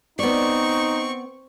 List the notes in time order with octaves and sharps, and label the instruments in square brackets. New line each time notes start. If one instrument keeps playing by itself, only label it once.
[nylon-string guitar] B3 D5 [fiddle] C4 C#6 [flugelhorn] D#4